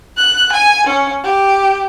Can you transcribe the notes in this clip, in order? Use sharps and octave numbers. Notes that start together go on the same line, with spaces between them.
F#6
G#5
C#4
G4